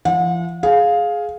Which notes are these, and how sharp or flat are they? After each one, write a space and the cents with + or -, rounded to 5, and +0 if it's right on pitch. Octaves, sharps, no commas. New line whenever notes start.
F3 -40 F#5 -40
G#4 +10 F5 +10